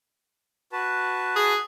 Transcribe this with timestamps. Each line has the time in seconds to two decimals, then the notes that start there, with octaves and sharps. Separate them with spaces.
0.72 F#4 B4 A5
1.36 G#4